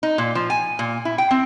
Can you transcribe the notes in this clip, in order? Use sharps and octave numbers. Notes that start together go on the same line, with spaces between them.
D#4
A#2
F3
G#5
A#2
E4
G5
C4